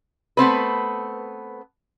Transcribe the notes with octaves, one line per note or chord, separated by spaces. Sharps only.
A3 B3 C4 B4